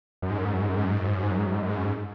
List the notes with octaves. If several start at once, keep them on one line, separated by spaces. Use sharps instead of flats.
F#2
G#2
F#2
G#2
F#2
G#2
F#2
G#2
F#2
G#2
F#2
G#2
F#2
G#2
F#2
G#2
F#2
G#2
F#2
G#2
F#2
G#2